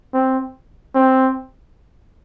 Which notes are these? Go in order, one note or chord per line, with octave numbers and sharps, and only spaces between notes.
C4
C4